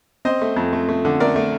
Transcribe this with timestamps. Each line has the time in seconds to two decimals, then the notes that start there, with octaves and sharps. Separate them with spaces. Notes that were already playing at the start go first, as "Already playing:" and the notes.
0.25 C4 C5 D#5
0.42 A3
0.56 F2
0.73 A3
0.89 A3
1.05 D3
1.20 A3 A#4 D5
1.36 A3